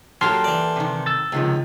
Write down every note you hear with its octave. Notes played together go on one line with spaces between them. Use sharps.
F#3 A#3 G4 A4 A5 C6 F6
E3 D5
C3 D#3
E6 A6
C#2 C3 D#3 F3